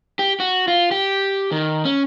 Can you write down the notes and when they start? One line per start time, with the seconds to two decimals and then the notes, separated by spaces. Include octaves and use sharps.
0.19 G4
0.40 F#4
0.68 F4
0.91 G4
1.52 D#3
1.85 C#4